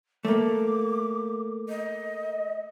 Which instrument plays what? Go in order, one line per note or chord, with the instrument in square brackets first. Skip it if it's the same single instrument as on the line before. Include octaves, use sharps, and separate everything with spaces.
[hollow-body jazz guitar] A3 A#3 [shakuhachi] D6
[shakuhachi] D#5